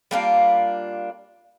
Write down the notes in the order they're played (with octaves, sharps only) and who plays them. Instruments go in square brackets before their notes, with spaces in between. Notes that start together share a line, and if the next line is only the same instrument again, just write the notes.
[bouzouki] G3 A#3 D4 F4